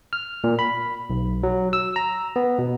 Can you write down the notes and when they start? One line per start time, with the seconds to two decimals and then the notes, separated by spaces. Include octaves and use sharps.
0.13 F6
0.44 A#2
0.59 B5
1.10 B1
1.43 F#3
1.73 E6
1.96 A#5
2.36 B3
2.59 B2